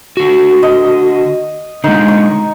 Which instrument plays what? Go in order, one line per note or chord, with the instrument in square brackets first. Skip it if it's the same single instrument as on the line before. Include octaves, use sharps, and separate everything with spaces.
[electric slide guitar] D3 F#4
[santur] D#5
[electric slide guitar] D3 G#3 [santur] D#4
[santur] C#6